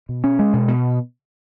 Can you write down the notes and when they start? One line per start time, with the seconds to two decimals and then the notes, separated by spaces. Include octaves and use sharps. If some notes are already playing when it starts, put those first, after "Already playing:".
0.09 B2
0.24 C#4
0.39 G#3
0.53 B2
0.68 B2